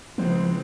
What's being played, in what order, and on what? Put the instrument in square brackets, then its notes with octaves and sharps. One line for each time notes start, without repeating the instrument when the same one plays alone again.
[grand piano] C#2 C#3 E3 G#3 C4 [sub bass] F3